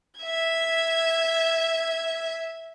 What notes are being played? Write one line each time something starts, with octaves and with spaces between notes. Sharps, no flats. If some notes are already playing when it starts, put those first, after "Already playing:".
E5 G#6